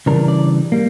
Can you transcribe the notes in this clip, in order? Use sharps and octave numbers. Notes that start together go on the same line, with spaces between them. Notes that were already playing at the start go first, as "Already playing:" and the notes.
C#3 E3 G3 D4 A#4
D5
G3 A#3